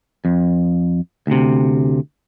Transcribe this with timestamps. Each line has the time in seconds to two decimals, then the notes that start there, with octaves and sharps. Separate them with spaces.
0.25 F2
1.27 D2 C3